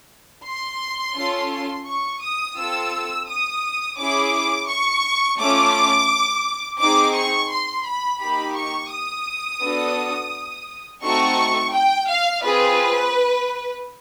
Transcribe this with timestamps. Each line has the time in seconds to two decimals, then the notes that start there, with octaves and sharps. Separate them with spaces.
0.46 C6
1.16 C#4 F4 A4
1.86 C#6
2.22 D#6
2.57 C4 F4 A4 E6
3.28 D#6
3.98 C#4 E4 G#4 D6
4.68 C#6
5.39 A3 C#4 F4 D6
6.80 C4 D#4 G#4 D6
7.15 C#6
7.50 C6
7.85 B5
8.20 A#3 D#4 G4 B5
8.56 C#6
8.91 D#6
9.62 B3 D4 F#4 A4
11.03 A3 C4 D#4 F#4 A4 C#6
11.73 G5
12.09 F5
12.43 C4 F4 G#4 B4